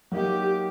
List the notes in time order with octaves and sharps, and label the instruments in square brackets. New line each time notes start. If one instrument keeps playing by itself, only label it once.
[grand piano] F#3 A#3 D#4 [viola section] G4